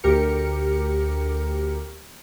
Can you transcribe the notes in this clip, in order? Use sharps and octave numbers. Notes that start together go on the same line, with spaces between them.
D2 G4 A#4 C#7